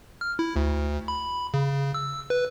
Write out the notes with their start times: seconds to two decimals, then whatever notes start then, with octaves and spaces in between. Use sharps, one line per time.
0.21 F6
0.39 E4
0.56 D2
1.08 B5
1.54 C#3
1.94 E6
2.30 B4